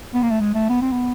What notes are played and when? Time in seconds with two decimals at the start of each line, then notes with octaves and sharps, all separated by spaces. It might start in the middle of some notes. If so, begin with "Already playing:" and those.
0.14 B3
0.23 A#3
0.31 A3
0.40 G#3
0.55 A3
0.69 B3
0.82 C4
0.93 B3